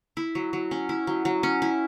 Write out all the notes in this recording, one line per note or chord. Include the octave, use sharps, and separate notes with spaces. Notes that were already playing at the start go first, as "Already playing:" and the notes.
E4
F#3
F#3
C#4
E4
F#3
F#3
C#4
E4